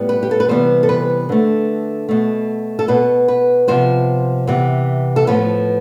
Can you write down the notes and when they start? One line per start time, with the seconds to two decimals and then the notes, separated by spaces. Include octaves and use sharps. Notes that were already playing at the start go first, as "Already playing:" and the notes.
Already playing: A2 G3 B3
0.09 B4
0.23 G4
0.31 A4
0.40 B4
0.48 C3 E3 G3 B3 C5
0.83 A4
0.89 B4
1.29 D3 A3
2.09 B2 A3
2.79 A4
2.88 B2 B3 B4
3.28 B4
3.68 C3 F3 B3 C5
4.47 C3 E3 B3
5.16 A4
5.27 A2 F3 B3 B4